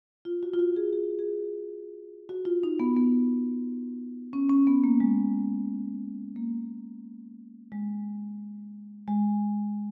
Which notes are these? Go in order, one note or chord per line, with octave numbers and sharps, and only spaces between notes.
F4
F#4
F4
F#4
G#4
G#4
G#4
F#4
F4
D#4
B3
B3
C#4
C#4
B3
A#3
G#3
A#3
G#3
G#3